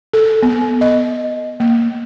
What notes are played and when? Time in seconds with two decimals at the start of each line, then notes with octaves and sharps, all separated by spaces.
0.13 A4
0.43 B3
0.81 D#5
1.60 A#3